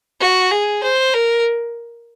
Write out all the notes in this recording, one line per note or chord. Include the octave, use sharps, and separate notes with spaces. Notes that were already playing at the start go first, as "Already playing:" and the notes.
F#4
G#4
C5
A#4